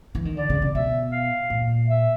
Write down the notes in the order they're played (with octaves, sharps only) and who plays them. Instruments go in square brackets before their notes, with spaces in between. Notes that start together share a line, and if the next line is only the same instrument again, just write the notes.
[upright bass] E3
D#3
[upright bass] D3 [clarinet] D5
[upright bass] C#3
C3
[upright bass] B2 [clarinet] E5
[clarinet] F5
[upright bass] A#2
[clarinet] E5